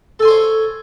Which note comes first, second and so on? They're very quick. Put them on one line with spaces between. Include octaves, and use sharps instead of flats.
A4 G#5 C6 C5 C#5